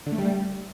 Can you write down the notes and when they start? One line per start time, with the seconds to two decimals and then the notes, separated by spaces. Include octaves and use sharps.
0.06 D3
0.12 A3
0.18 G3